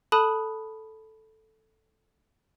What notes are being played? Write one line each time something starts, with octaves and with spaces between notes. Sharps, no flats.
A4 A5 B5 D#6 F#6 D#7